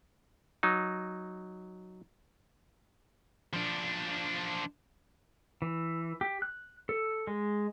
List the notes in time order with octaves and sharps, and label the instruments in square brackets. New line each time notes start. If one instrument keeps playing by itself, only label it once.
[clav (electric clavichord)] F#3 D#4
[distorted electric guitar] F3 D4
[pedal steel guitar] E3
G4
F#6
A4
G#3